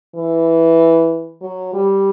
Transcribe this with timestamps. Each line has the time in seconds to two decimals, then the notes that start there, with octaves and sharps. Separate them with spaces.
0.15 E3
1.42 F#3
1.74 G3